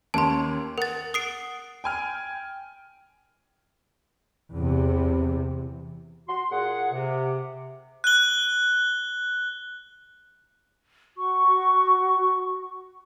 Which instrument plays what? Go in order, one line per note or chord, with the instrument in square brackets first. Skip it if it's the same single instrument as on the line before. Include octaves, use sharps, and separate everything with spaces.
[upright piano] D#2 A#3 C#4 [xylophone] A5 C6
[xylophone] A#4 A6 [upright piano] F#5
[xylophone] D#6 C7 D7
[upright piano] G5 G#5 F6
[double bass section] E2 C3
[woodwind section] F#4 C6
A#2 G#4 F#5
C3
[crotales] F#6 G7
[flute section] F#4 C#6